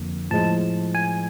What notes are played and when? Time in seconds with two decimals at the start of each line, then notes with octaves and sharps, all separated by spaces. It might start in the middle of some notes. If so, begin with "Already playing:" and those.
Already playing: F2 D3 F3 A#3
0.31 A2 F3 G#3 A5
0.95 G#5